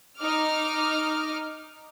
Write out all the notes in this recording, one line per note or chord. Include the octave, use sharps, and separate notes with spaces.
D#4 D6 F6